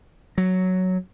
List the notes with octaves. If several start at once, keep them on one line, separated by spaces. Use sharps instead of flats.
F#3